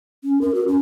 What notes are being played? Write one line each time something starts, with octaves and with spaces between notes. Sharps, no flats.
C#4
A#4
F#4
C#4